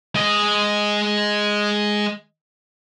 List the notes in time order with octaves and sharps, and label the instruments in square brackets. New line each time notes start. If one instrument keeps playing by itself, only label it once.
[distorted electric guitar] G#3 D#5